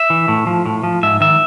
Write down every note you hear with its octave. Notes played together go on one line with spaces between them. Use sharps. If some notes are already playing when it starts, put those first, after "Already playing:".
Already playing: E5
E3
A2
F3
A2
F3
G#2 E5
D#3 E5